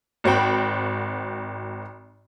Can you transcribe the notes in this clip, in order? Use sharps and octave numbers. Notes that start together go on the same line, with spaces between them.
G#1 F#4 C5 G5 B5